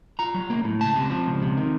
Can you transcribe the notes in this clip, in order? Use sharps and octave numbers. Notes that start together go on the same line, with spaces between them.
F4 A#5
F#3
A#3
A2
C#2 A5
C3
F3
C#2
C3
D#3